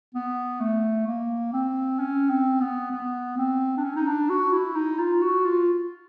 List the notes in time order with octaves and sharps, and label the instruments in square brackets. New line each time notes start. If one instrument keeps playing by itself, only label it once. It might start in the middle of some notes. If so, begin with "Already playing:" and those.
[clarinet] B3
A3
A#3
C4
C#4
C4
B3
B3
C4
D4
C#4
D#4
D4
F#4
E4
D#4
F4
F#4
F4